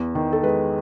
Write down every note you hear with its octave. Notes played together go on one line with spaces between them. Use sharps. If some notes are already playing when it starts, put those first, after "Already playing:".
Already playing: E2
D#3
A4
G#3 B4